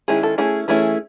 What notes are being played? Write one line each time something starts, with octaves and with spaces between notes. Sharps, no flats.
D#3 G#3 C#4 E4 G#4
A4
A3 C#4 E4 G#4
E3 A3 C#4 E4 G#4